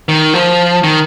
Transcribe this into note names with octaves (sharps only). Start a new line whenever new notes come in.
D#3
F3
D#3